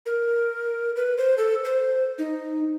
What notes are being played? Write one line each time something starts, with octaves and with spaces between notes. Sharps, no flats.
A#4
B4
C5
A4
C5
D#4